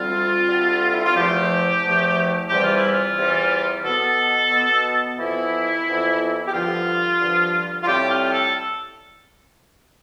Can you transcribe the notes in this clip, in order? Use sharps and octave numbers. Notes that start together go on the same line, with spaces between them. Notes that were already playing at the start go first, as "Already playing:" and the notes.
Already playing: D2 D3 G3 C4 F4
D2 D3 G3 C4
E4
F4
E2 C3 F3 A3 G4
E2 C3 F3 A3
E2 C3 E3 G3 G4
F4
E4
F4
E2 C3 E3 G3
B2 B3 A4
B2 B3
F2 E3 B3 E4
F2 E3 B3
G4
G2 D3 F3 F4
G2 D3 F3
F4
A2 G3 C4 G4
F4
A4